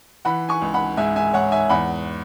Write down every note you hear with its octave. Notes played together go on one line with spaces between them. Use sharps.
E3 F#5 B5
G#5 C#6
C#2
F#5 B5
G#2 E5 G#5
E5 G#5
G#2 C#5 F#5
E5 G#5
E2 F#5 B5